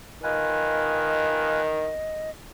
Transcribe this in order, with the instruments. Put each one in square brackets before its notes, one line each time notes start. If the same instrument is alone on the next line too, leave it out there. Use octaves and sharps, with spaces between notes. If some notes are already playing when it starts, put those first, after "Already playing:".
[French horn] D#3 [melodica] F4 B4 G#5 [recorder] D#5